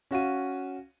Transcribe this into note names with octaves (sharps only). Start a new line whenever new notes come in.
C#4 F#4 F5 D#7